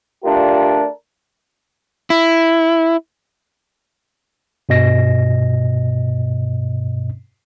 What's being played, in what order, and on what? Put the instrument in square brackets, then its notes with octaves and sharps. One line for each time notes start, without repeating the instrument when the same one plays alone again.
[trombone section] A3 D4 F4 G4 A#4
[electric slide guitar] E4
[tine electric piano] G2 B2 D#5 A#6